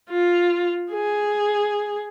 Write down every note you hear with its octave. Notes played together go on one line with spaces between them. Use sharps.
F4
G#4